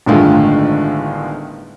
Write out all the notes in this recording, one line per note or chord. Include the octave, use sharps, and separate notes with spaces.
G1 A2 D3 D#3 G#3 F4